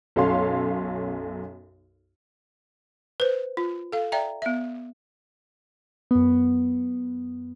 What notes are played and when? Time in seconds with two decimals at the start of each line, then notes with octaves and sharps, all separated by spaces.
0.16 B1 F#2 A4 C#5 F5 C6
3.20 B4 C5
3.57 F4
3.92 A4 F5
4.12 D5 E5 G5 A#5
4.42 B3 E5
6.11 F#2 B3